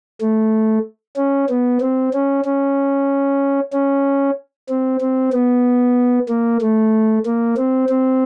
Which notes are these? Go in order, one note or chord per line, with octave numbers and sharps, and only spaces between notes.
A3
C#4
B3
C4
C#4
C#4
C#4
C4
C4
B3
A#3
A3
A#3
C4
C4